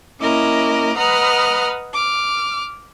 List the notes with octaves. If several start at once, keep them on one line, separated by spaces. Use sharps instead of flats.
A#3 C#4 E4 A#4 D#5 D6
B4 D#5 F#5 A#5 D#6 F6
D6 F6